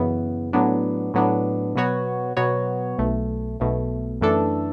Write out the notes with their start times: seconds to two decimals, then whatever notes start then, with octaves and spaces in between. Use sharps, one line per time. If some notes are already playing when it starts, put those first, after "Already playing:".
Already playing: F#2 C#3 E3 B3
0.53 A2 F#3 B3 D4
1.14 A2 F#3 B3 D4
1.75 B2 F#3 B3 F#4 C#5
2.37 B2 F#3 B3 F#4 C#5
2.98 B1 B2 A3
3.60 B1 B2 A3
4.21 F#2 E3 A3 D4 A4